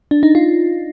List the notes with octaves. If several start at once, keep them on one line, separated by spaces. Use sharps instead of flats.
D4
D#4
F4